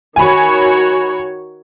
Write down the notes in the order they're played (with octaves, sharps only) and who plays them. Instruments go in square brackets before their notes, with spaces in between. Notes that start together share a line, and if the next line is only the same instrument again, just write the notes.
[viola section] D#3 F#4 C#5 [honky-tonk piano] G#5 B5